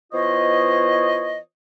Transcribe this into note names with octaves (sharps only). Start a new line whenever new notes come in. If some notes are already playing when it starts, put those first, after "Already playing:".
E3 B3 F4 C5 C#5 D#5